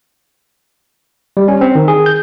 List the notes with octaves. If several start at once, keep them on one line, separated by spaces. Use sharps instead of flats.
G3
C#4
C4
D#3
G#4
G6